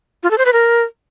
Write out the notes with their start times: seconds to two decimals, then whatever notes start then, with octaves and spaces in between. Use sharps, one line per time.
0.23 F4
0.31 A4
0.38 C5
0.46 B4
0.53 A#4